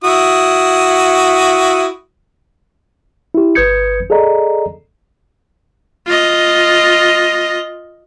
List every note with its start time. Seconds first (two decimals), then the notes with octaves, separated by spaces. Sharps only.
0.04 E4 F#4 D#6
3.35 E4 G4
3.55 G1 B4 D#6 G6 G#6 C#7
4.10 G#4 A4 D5 D#5 A#5
6.07 F4 D#5